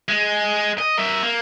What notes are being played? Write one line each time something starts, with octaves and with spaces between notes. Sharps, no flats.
G#3
D#5
A#4 E5
A#3